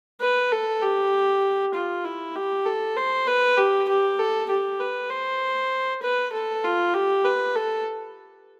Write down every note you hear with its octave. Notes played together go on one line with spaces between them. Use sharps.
B4
A4
G4
F4
E4
G4
A4
C5
B4
G4
G4
A4
G4
B4
C5
B4
A4
F4
G4
B4
A4